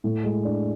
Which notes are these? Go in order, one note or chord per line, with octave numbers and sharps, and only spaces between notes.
A2
G#3
D4